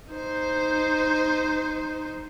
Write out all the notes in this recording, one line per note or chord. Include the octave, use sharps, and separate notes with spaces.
D#4 C5